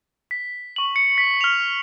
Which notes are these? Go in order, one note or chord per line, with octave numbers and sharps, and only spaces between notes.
B6
C#6 F#7
C#7
B6
F6 F7